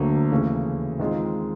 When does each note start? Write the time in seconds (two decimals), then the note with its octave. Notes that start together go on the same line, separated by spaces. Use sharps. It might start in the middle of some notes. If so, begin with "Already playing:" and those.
Already playing: D2 D3 F#3 A#3
0.31 D#2 C#3 E3 A3 C#4
0.99 D#3 G#3 C4 F4